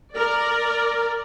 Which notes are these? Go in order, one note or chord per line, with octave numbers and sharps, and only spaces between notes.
A#4 D5